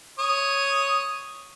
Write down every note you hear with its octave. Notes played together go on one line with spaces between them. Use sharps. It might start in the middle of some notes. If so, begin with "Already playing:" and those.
C#5 D#6